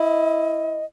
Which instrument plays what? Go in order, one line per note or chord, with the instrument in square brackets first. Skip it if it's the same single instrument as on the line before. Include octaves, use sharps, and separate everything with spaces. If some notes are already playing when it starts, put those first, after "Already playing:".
Already playing: [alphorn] E4 [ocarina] D#5